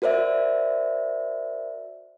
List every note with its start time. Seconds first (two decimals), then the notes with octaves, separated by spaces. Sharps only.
0.02 F#4 A#4 C5 D5 E5